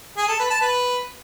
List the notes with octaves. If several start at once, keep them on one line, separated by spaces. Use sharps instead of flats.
G#4
A4
B4
A5
B4